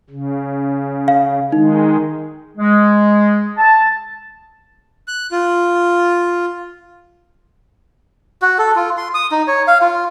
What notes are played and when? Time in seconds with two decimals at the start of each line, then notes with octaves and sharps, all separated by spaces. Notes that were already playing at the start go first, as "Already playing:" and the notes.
0.10 C#3
1.08 F5
1.52 D#3 G#3 D#4
2.58 G#3
3.58 A5
5.08 F#6
5.32 F4
8.42 F#4
8.58 A4
8.76 F4
8.98 C6
9.14 D#6
9.32 D#4
9.48 C#5
9.68 F5
9.82 F4